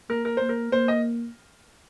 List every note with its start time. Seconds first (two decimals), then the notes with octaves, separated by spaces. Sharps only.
0.10 A#3 A#4
0.25 A#4
0.37 A#3 C5
0.49 A#4
0.72 A#3 C5
0.88 D#5